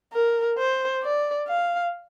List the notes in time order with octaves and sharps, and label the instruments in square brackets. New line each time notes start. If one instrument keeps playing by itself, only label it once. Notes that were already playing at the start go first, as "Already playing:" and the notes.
[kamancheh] A#4
C5
D5
F5